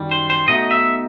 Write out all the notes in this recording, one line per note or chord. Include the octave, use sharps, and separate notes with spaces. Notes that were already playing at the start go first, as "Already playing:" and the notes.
Already playing: F#2 D#3 G3
C5
C5
B1 B2 A3 D#4 D#5
E5